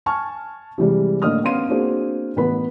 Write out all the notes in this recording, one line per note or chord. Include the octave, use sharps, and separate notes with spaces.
G#5 A5 C#6 F6
C3 E3 G3 G#3
A2 D3 A#3 D#5 D#6 F6
B3 C#4 F5 C6 D#7
A#3 C4 D4 F#4 G#4 C5
A1 B3 B4 B5